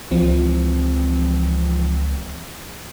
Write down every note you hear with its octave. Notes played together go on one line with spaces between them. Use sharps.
C#2 E3 F3 C4